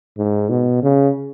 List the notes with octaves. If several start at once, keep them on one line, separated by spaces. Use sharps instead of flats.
G#2
B2
C#3